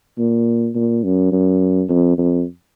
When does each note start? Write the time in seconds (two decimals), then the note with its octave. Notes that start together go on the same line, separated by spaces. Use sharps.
0.18 A#2
0.75 A#2
1.04 F#2
1.32 F#2
1.89 F2
2.18 F2